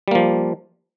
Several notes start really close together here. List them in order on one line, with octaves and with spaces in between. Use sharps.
G3 A#3 F3